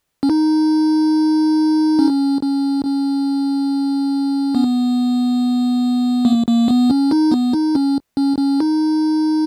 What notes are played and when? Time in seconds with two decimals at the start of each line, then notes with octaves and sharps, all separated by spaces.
0.23 C#4
0.30 D#4
1.99 C#4
2.43 C#4
2.85 C#4
4.55 B3
6.25 A#3
6.47 A#3
6.68 B3
6.90 C#4
7.11 D#4
7.31 B3
7.53 D#4
7.75 C#4
8.17 C#4
8.38 C#4
8.60 D#4